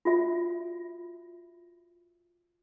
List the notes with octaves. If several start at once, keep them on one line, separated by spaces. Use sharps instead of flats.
F4 F#4 E5